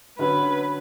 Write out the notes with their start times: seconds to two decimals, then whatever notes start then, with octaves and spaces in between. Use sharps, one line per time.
0.18 D3 F#3 C#4 B4